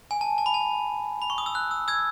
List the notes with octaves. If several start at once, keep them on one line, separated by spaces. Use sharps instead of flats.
G#5
A5
A5
B5
A5
B5
C#6
D#6
E6
F#6
E6
E6 G#6